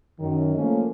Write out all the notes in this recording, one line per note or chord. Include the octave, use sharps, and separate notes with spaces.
F#2 D#3
F3 A3 A#3 C#4